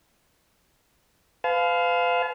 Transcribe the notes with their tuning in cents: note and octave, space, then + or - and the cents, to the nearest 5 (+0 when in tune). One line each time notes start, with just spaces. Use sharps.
B4 +40 F5 +0 A5 -45